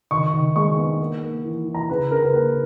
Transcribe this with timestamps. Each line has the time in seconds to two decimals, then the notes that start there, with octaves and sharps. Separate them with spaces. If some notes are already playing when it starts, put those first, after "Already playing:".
0.11 D#3 C#6
0.34 D#3
0.56 G#3 C#6
0.77 B3
1.00 A#3
1.23 A#3
1.45 E3
1.67 E3
1.74 A#5
1.89 C#3 B4
2.11 C#3 A#4
2.22 B4
2.34 A#3 B4